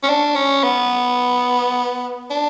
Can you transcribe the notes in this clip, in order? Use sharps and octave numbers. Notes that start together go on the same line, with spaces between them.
C#4
D4
C#4
B3
D4